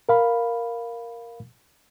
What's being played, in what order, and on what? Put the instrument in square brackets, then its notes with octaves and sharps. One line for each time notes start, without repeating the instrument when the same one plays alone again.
[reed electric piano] A#4 F5 B5